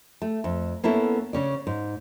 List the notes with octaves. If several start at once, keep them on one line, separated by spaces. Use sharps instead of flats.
A3
F2
A#3 B3 C#4 E4 A4
C#3 C#4 D5
G#2